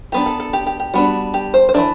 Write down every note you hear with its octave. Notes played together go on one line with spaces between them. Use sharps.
F#3 B3 D4 G4
A4
A4
G4
G4
G4
G3 B3 D4 F#4
G4
C5
C5
E3 A3 D4 D5